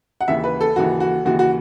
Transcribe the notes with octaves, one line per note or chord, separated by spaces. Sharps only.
F#5
D#2 C#3 E3 E5
B4
A4
D#2 C#3 E3 F#4
F#4
D#2 C#3 E3 F#4
F#4